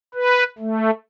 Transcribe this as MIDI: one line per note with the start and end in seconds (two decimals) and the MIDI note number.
0.15 0.44 71
0.59 0.91 57